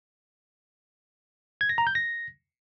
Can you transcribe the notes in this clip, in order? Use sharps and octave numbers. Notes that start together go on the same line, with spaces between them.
G#6
A#6
A#5
G6
A#6